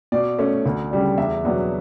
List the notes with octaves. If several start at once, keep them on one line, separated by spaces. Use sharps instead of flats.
B2 D5
A3 C#4
D2
C#3 G3 D4
E2 E5
B2 F#3 B3 D4